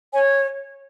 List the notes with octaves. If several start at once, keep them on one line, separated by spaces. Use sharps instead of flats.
C#5 G#5